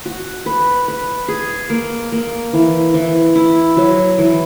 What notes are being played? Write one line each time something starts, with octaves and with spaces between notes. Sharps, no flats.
F#4
B4
B4
G#4
A#3
A#3
E3
E3
E4
F#3
E3